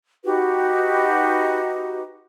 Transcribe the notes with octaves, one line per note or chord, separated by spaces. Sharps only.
D#4 F#4 G4 B4